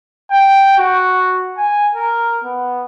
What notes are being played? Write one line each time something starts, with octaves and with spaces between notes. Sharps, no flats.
G5
F#4
G#5
A#4
B3